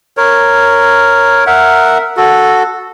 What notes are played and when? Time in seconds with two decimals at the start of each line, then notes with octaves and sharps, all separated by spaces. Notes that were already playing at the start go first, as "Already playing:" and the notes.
0.17 A#4 C#5
1.47 A#4 E5 F#5
2.17 F#4 A4